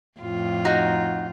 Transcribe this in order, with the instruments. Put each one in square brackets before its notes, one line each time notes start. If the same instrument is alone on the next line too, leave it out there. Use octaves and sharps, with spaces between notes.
[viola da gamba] F2 A2 F4
[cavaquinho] D#4 F#4 A#5